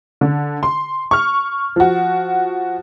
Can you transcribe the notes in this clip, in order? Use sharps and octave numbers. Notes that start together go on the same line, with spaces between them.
D3
C6
C#6 F6
F3 F#4